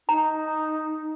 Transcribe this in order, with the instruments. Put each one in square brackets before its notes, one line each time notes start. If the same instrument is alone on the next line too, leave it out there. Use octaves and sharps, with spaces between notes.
[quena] D#4 [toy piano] A#5